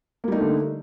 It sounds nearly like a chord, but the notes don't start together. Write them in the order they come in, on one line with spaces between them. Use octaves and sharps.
A#3 G3 D#4 A3 D3